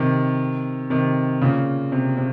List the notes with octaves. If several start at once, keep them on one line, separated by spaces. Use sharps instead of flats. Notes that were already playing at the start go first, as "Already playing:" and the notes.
Already playing: C3 D#3
C3 D#3
A#2 C#3
C3
C3